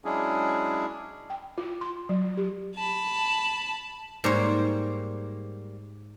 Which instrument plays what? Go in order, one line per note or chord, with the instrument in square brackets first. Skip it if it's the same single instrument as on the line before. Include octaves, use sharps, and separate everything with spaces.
[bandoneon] F#3 G#3 C#4 D4 E4 G#4
[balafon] G5
F4
C6
F#3
G4
[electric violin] A5 B5
[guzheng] G#2 C#5 [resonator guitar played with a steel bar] G3 A#3 C5